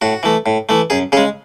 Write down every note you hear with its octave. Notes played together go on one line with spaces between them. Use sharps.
A2 F#4
E3 A3
A2
E3 A3
F#2 G#4
C#3 G#3 G#4